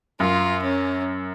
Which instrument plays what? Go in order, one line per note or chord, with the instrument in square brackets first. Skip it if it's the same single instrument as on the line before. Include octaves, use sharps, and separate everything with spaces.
[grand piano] F#2 [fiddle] F4
[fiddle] C#4